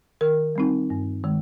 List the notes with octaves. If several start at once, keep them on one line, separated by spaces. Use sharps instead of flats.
D#3 A#4
G3 C4 D#4
G2
D#3 G#3